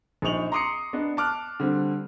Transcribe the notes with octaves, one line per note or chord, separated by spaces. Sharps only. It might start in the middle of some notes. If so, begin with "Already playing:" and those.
A#1 D#4 D#5 C#6 F7 F#7
A#5 C6 D6 D#6 C7 C#7
B3 D4 D#5
A5 D6 F6 F#6
D3 G3 C4